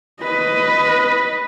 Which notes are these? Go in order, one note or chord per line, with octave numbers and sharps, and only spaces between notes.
B4 D#5